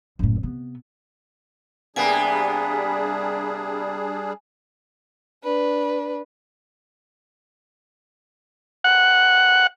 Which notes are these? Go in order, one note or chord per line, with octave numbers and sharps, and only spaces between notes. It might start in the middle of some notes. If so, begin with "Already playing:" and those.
F#1 A2
C3 B3
C3 G3 A#3 B3 D4 G#4 G#5
D4 B4
F#5